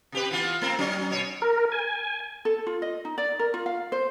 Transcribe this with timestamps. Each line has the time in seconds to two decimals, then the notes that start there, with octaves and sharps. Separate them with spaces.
0.12 C3 G4 B4
0.31 E3 B3 F4
0.61 A3 A#3 C4
0.79 F#3 C#4 D#4
1.11 B2 C#5
1.42 A#4
1.72 G#5
2.45 A4
2.67 F4
2.82 D#5
3.05 D#4
3.18 D5
3.39 A#4
3.54 F4
3.66 F5
3.92 C5